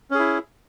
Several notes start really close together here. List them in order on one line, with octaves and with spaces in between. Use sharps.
C#4 G#4 E4